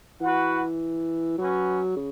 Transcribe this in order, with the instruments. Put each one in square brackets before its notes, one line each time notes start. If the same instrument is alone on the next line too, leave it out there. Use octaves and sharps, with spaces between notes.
[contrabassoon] E3 [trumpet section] F#4 B4 F#5
[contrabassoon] F#3 [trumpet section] C#4 F#4 B4
[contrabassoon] C#3